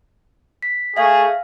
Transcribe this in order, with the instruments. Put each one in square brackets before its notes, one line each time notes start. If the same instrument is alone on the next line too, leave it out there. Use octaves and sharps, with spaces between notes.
[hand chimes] B6
[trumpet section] A3 G#4 [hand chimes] E5 F5